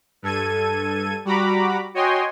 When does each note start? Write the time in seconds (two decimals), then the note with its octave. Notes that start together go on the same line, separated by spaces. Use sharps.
0.22 G2 A4 G#6 D#7
1.25 G3 F#4 A#5 B5 D6
1.94 F#4 C#5 D#5 G5 G#5 C6